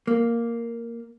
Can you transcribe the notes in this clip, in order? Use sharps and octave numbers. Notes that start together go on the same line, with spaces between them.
A#3